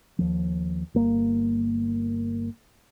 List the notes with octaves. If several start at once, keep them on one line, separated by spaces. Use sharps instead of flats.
D#2 F3
G1 A#3